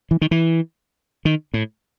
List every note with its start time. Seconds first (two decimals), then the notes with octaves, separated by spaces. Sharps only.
0.11 E3
0.21 D#3
0.31 E3
1.25 D#3
1.54 A2